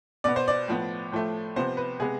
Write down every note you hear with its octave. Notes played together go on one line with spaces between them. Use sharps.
B2 B3 D5
C5
D5
A2 F3 B3
A2 F3 A3
C3 F3 B3 C5
B4
C3 G#3 B3 G#4